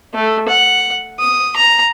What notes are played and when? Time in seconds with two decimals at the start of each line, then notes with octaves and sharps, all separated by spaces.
0.14 A3
0.48 F#5
1.19 D#6
1.56 A#5